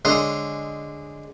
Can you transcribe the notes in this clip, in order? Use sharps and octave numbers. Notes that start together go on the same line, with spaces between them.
D3 G#3 C#5 C6 D#6